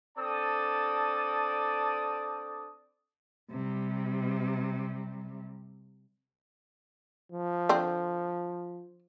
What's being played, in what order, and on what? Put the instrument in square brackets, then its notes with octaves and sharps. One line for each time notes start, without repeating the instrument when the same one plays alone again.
[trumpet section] C4 D4 A4 D5 A5 D#6
[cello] C3 G3
[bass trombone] F3
[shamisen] D3 C4